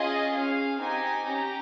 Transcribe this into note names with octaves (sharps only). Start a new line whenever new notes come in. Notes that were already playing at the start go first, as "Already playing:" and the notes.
Already playing: C#4 F4 G#4 D#5
C#4 G#4 F5
C4 D#4 G4 G#5
C#4 G4 A#5